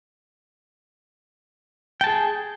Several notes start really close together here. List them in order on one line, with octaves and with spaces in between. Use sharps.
G5 A5 G#4